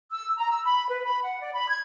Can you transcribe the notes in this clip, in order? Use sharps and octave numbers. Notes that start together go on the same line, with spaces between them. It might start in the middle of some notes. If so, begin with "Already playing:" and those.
E6
A#5
E6
B5
B4
B5
F#5
D5
B5
G#6